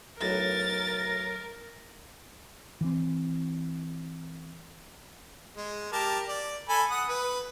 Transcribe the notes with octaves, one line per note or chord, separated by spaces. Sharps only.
B1 A2 A#4 A#5 A6
E3 C4
G#3
G4 A#4 A5
D5
A4 G#5 B5
F#5 D#6
B4